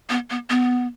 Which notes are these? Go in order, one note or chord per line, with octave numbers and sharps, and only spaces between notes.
B3
B3
B3